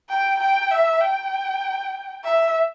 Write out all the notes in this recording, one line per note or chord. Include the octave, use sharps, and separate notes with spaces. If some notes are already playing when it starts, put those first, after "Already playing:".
G5
G5
E5
G5
E5